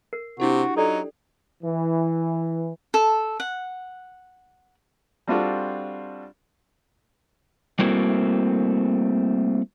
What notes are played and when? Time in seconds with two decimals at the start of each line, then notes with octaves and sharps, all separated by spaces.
0.13 A#4 C7
0.40 C3 D4 E4 F#4 G4
0.77 F#3 D#4 A4 D5 G5
1.63 E3
2.94 A4
3.40 F#5
5.27 G3 C4 D4 F4 F#4 A4
7.79 G3 A3 A#3 C4 E4 F#4